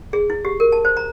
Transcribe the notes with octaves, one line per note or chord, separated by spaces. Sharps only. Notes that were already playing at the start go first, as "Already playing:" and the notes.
G#4
E4
G4
A#4
A5
C5
A#5